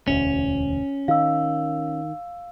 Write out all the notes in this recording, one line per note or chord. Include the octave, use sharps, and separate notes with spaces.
E1 D2 C#4
D#3 F5 E6